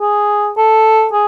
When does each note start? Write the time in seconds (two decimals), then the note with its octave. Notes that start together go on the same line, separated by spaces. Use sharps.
0.01 G#4
0.57 A4
1.13 G#4